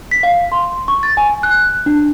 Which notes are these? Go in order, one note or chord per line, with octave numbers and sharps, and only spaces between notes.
B6
F5
C6
C#6
A6
G#5
F#6
D4